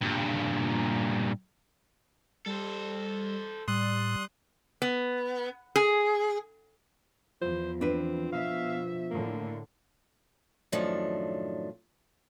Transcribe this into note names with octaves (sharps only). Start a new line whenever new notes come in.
G2 A#2
G3 A4 C5
A2 G3 C6 D#6 F#6
B3
G#4
E2 F3 C5
C4 D4 B4
B2 E5 F5
A2 D3 A#3
F#2 A2 D#3 F3 D4